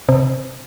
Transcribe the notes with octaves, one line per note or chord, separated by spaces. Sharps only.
C3